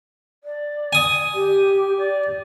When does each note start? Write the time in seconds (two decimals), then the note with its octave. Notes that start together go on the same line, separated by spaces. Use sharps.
0.44 D5
0.93 G#5 D#6
1.34 G4
1.98 D5